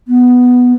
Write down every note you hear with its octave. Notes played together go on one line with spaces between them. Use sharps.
B3